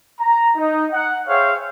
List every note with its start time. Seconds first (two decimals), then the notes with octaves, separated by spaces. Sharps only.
0.20 A#5
0.56 D#4
0.92 F#5
1.28 G#4 C5 C#5 E5 F5 G5